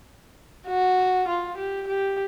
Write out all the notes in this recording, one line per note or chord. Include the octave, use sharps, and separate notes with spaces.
F#4
F4
G4
G4